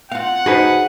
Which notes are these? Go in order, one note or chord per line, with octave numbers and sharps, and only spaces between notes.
C4 F4 F5 F#5
D2 D#4 F#4 G#4 B4 C5 A5